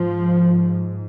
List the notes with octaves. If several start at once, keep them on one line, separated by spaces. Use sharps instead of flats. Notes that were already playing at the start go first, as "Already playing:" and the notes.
Already playing: G#2 F3